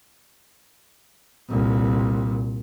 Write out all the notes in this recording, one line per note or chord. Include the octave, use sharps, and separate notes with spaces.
C2 A#2